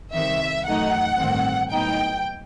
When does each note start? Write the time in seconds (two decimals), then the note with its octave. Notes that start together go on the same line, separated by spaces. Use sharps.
0.14 C2 C3 D#3 E5
0.66 F#2 E3 A3 D#4 F#5
1.19 A1 G2 D#3 A3 C4
1.72 A2 F#3 B3 D#4 G5